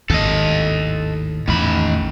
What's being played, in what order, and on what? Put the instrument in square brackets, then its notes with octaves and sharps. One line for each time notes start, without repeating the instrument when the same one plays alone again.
[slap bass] G#1 D#2 A2 [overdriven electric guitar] A4 D#5
[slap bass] A1 E2 [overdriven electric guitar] D#3 B5